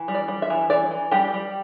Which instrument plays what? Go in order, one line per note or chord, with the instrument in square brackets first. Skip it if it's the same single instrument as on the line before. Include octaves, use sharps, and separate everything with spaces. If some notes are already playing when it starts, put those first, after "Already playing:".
Already playing: [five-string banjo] E3
G3
D5
G3
E5
E3
E3 D5
E3
G3 G4
G3